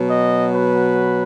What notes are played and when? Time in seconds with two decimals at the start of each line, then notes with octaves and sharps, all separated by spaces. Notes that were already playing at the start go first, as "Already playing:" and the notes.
Already playing: B2 F#3
0.10 D#5
0.53 B4